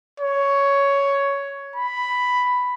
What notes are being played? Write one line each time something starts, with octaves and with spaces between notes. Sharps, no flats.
C#5
B5